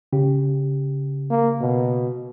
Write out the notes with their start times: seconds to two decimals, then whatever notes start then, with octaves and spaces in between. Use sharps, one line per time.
0.13 C#3 G4
1.30 A#3
1.61 B2